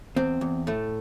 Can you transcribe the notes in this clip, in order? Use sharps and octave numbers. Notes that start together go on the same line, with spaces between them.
E2 C4
E2
A2 A3